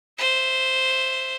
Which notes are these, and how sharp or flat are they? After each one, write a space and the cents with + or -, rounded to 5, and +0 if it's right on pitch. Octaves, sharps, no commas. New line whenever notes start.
C5 +0 E5 +10